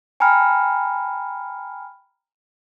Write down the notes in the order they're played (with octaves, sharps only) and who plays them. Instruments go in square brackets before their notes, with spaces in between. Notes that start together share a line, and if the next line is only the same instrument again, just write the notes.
[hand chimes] G5 G#5 A#5 B5 F6